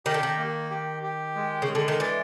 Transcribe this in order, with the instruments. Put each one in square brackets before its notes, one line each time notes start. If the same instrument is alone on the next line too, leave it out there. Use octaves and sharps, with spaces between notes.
[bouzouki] D#3 [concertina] G4
[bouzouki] D3
D#3
[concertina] A#3
G4
G4
G#3
[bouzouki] C#3
[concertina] G#3
[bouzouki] D3
D#3
[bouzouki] E3 [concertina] D5